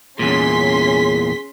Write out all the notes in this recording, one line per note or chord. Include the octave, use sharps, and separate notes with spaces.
E2 A#2 C#4 G#4 C6 B6